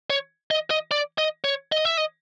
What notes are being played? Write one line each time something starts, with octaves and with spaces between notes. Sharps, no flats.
C#5
D#5
D#5
D5
D#5
C#5
D#5
E5
D#5